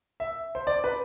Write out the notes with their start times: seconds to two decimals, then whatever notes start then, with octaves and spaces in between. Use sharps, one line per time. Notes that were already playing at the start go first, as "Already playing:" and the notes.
0.20 E5
0.55 C5
0.67 D5
0.84 B4